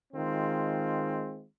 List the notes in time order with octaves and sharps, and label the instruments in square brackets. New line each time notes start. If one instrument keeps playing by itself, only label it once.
[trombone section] D#3 G#3 C4 F4